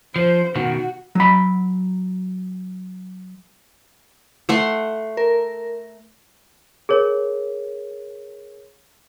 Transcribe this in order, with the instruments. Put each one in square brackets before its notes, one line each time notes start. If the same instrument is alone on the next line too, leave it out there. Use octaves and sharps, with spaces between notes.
[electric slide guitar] F3 [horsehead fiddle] C5
[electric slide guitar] B2 D#3 [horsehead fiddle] F#4
[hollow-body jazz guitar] F#3 B5
[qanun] A3 F#5 C6
[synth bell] A#4
[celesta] G#4 A#4 C#5